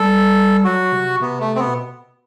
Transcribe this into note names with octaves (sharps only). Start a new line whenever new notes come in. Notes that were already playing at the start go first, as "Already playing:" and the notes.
Already playing: G3 A4
F#3 F#4
C3
C3 B3
A3
C4
B3
B2